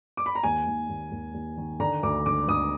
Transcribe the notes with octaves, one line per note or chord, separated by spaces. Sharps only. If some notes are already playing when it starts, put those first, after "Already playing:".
D6
B5
A#5
D#2 G#5
D#2
D#2
D#2
D#2
D#3
D3 A#5
D2 D6
D3 D6
D2 D#6